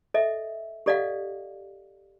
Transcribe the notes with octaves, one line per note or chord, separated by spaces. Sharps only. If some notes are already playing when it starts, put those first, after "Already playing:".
A4 D#5 E5
G4 A4 D5 D#5 F5 F#5